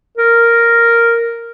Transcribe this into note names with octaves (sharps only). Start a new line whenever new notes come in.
A#4